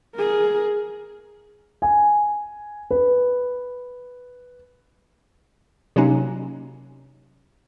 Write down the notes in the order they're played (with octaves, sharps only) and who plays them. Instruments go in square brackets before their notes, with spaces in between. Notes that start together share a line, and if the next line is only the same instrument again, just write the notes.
[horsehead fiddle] G#4 A#4
[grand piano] G#5
B4
[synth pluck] C3 F#3 A#3 C#4 D#4